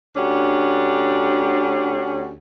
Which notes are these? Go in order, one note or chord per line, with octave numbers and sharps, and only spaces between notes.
D2 C#4 D4 G4 F#5